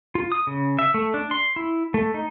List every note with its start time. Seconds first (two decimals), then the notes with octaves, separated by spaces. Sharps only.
0.15 F4
0.32 D#6
0.47 C#3
0.79 E5
0.94 A3
1.14 D4
1.31 C6
1.56 E4
1.94 A3
2.14 D#4